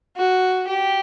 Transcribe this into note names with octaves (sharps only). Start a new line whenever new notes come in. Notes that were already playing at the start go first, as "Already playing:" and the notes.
F#4
G4